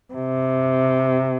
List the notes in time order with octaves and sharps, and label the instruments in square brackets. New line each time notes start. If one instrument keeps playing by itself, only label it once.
[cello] C3